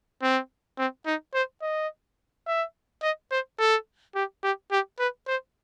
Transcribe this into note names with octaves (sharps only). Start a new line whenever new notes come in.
C4
C4
D#4
C5
D#5
E5
D#5
C5
A4
G4
G4
G4
B4
C5